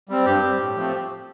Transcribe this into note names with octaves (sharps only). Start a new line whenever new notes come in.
G3 C4
G2 G4
G3 C4
A2
F3 A3 C4